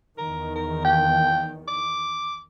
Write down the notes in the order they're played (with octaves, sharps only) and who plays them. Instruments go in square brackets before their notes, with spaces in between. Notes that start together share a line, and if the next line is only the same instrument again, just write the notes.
[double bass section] E2 D#3 [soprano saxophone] A#4
[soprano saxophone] A#4
G5
D6